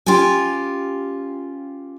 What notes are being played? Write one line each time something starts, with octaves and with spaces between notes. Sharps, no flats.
C#4 F4 G4 G5 G#5